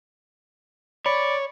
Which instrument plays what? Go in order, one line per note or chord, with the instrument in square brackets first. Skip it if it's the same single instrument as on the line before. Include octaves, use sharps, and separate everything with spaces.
[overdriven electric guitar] C#5 [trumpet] D5 [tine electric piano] B5